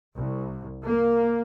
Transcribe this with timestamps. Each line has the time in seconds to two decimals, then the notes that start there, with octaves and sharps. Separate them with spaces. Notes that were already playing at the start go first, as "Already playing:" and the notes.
0.16 C2
0.85 A#3